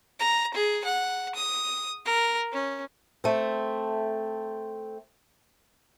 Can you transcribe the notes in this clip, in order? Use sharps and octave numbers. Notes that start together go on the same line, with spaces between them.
A#5
G#4
F#5
D#6
A#4
C#4
A3 C4